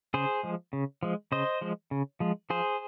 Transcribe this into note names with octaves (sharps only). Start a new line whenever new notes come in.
C#3 G#4 C5
F3 G#3
C#3
F3 G#3
C#3 C5 D#5
F3 G#3
C#3
F3 G#3
F3 G#4 C5